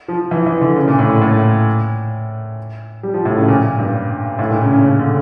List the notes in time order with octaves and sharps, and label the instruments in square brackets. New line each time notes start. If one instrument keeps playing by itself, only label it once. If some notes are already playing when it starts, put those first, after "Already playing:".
[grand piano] F3
E3
E3
D3
C#3
A#2
A2
A2
G3
F3
A2
C#3
A#2
G2
A2
A#2
C#3
C#3
C#3
D3